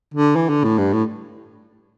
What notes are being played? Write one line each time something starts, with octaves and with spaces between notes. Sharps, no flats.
D3
E3
D3
A2
G2
A2